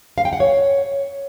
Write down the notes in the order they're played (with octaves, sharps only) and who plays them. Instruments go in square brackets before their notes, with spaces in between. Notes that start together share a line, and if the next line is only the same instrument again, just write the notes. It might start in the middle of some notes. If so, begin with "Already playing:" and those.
[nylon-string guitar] F5
G5
F#5
C#5